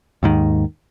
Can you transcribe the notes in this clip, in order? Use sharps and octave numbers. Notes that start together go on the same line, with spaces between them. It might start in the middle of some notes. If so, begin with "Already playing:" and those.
D#2 G#2 D#3